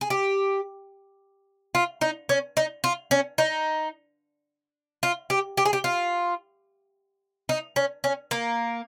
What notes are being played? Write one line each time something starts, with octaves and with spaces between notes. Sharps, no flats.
G#4
G4
F4
D#4
C#4
D#4
F4
C#4
D#4
F4
G4
G4
G#4
G4
F4
D#4
C#4
C#4
A#3